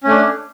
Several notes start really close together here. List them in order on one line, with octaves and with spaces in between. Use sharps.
C#4 A3 D4